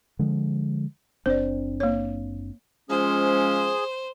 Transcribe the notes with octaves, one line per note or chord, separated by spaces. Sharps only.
D3 F3 G#3
F#1 C4 D4 C5 D5
A#3 C#5
F3 G#3 C#4 G#4 C5